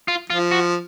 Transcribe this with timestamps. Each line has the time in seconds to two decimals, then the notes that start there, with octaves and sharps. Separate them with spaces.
0.08 F4
0.30 F3 F4
0.51 F#4